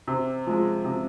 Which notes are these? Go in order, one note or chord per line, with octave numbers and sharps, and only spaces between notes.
C3
F3 G#3
C3